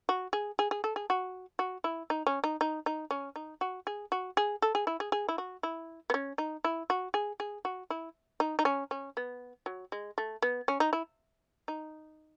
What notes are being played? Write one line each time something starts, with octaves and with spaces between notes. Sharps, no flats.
F#4
G#4
G#4
G#4
A4
G#4
F#4
F#4
E4
D#4
C#4
D#4
D#4
D#4
C#4
D#4
F#4
G#4
F#4
G#4
A4
G#4
E4
G#4
G#4
E4
F#4
E4
B3
C#4
D#4
E4
F#4
G#4
G#4
F#4
E4
D#4
D#4
C#4
C#4
B3
F#3
G#3
A3
B3
C#4
D#4
E4
D#4